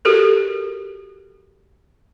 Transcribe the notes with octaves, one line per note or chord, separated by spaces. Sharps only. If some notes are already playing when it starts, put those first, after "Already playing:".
F#4 G4 A4 A#4